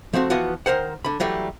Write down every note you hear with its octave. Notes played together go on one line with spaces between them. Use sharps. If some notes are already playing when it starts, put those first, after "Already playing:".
F3 A3 C4 F#4
E3 F3 B3 F#4
D#3 A#4 C5 F#5
D3 B5
E3 F#3 G3 A3